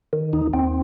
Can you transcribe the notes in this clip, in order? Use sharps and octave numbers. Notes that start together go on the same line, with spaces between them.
D#3
D#2 D#4
D#2 C4